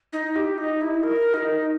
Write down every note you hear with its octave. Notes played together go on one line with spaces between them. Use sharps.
D#4
G4
D#4
E4
A#4
D#4